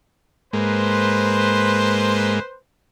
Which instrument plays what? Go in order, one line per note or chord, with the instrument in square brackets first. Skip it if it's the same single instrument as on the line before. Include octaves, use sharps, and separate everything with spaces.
[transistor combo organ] G#2 G#3 A#3 [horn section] B4 C5